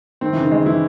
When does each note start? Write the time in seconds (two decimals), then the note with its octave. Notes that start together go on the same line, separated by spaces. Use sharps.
0.21 D#3 C4
0.32 C#3 E3
0.42 D#3
0.51 G#3
0.66 E3 E4